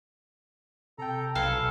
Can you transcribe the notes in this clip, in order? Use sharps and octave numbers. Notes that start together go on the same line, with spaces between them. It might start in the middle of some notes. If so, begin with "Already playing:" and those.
C3 A4 G5 A#5
B1 A4 B4 F5 G#5